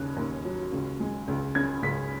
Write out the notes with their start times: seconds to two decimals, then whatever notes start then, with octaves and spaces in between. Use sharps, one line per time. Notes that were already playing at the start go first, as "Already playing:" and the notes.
Already playing: D#2 C#3 F#6
0.17 D#2
0.45 F#3
0.72 C#2
1.00 G#3
1.28 C#2
1.55 C#3 G#6
1.82 C#2 B6